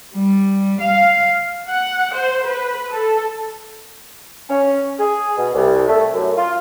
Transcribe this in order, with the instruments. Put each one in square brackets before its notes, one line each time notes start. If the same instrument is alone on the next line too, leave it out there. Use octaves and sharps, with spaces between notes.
[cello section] G3
F5
[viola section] F#5
C5
B4
A4
[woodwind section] C#4
G#4
B2
C2
A3
F#2
F4